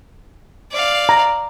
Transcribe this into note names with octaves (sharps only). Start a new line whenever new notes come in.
D5 F5
A#5